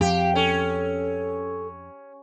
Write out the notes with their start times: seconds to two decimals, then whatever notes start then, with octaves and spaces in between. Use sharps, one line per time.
0.01 F2 G4 F5
0.35 C#4 A4